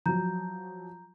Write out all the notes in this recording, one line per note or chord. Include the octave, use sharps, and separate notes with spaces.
F3 F#3 A#5 G6